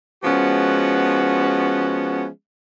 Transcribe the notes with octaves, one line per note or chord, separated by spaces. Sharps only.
F3 G#3 B3 C#4 F#4